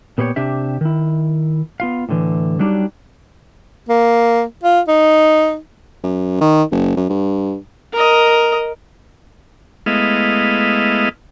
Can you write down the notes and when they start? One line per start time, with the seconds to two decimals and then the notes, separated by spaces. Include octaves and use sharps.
0.18 A#2 B3 G4 C5 C#5
0.36 C3 D4 G4 E5
0.81 D#3 E4
1.80 B3 F4 F5
2.09 A2 D3 E3
2.59 F#3 G3 D4 D#4 F#4 G4
3.89 A#3
4.63 F4
4.88 D#4
6.03 F#2
6.41 D#3
6.71 F#1
6.96 F#2
7.09 G2
7.93 A#4 D#5
9.86 G#3 A3 B3 E4 D#5 F5